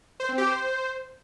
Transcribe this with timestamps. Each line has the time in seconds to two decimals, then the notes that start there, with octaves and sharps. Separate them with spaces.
0.20 C5
0.29 C4
0.38 G4
0.47 C5